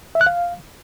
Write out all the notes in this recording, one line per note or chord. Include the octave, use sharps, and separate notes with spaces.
E5
F#6
F5